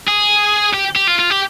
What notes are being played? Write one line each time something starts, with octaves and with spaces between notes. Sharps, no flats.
G#4
G4
G4
F4
F4
G4